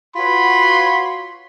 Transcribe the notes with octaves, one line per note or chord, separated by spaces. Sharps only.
F4 F#4 B4 C#5 B5 C6